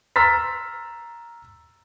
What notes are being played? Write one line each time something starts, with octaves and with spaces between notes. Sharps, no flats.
A#5 C6 E6 F6 A6 B6